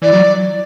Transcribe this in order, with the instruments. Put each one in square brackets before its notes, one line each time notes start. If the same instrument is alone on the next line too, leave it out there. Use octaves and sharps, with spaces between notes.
[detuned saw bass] E3 [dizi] D5
[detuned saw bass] F#3